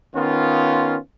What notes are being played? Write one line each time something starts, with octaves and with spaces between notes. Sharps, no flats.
D#3 B3 C#4 F4